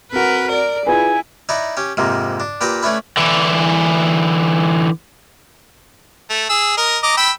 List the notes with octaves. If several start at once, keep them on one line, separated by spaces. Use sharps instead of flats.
C4 F#4 A#4 B4
A#4 D5
E4 F4 G#4 B4 G#5
D#4 E4 D5 F#5 A#5
C#4 G4
F2 G#2 C3 A#3
D4
A#2 G4 B4 G5 A#5 D#6
A3 C#4 D4 E4 B4
D3 E3
A3
G#4 E6
A#4 D#5
D#5 A#5 D6
G5 B5 E6